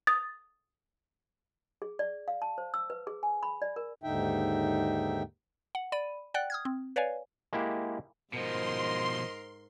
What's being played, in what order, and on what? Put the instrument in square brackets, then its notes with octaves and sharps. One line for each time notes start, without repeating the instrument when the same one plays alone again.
[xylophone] D#6 A6
[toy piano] G#4
D5
F5
A5
C5
E6
B4
G#4
G#5
B5
D5
A#4
[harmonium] D#2 G#2 D3 D#4 E5 G5
[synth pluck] F#5
D5 B5 D#7
D5 F#5 G5 F#6
D#6 F6 G#6
C4
B4 C#5 D5 F5 G#5
[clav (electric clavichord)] G#3 A#3 E4 G4
[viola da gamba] G#2 A#4 [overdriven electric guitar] B2 F3 [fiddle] C5 D#5 [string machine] C6